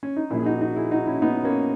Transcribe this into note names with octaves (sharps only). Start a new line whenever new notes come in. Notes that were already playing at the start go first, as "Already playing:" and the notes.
C#4
D#4
A#1 A#2 C#4 E4
G#4
D#4 F#4
D#4 F#4
E4 G#4
D#4 F#4
C#4 E4
B3 D#4
A#3 C#4